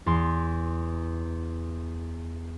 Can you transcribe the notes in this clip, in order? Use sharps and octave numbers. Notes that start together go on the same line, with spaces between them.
E2 C6